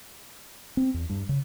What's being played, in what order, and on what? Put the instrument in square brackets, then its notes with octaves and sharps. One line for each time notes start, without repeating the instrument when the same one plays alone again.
[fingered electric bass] C4
E2
G2
C#3